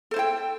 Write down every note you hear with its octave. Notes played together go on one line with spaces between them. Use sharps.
E4 A4 C5 G5